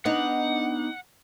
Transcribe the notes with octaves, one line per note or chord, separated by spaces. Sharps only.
B3 D4 D#4 F#5